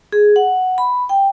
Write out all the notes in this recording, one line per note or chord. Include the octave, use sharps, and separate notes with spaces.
G#4
F#5
B5
G5